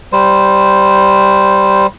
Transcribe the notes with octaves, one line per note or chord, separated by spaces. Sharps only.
G3 C5